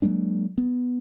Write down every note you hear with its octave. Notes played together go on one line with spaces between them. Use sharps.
F#3 G#3 A#3 D4
B3